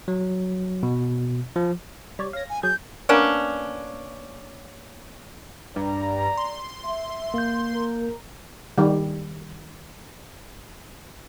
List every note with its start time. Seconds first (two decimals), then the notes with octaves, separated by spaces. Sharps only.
0.08 F#3
0.83 B2
1.56 F3
2.19 G3 C#5 D5
2.33 C#5 F5 A#6
2.49 G#5
2.63 F#3 G#4 G6 G#6
3.09 A#3 B3 C#4 D4
5.76 G2 D5 A#5
6.37 C6
6.84 E5
7.34 A#3 G6
7.73 A#4
8.78 D#3 G3